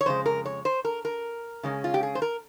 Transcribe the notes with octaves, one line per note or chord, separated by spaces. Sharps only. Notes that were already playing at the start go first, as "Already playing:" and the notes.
C#5
F2 C#3 G#3 C5
A#4
C#5
C5
A#4
A#4
C#3 G#3 C#4
F4
G4
G#4
C5
A#4